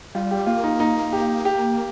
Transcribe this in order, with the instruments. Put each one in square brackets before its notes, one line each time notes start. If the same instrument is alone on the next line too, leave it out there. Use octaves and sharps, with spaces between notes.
[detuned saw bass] G3 [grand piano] F4
[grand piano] G4
[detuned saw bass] A#3 [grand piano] F4
[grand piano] D#4
D#4
G4
G4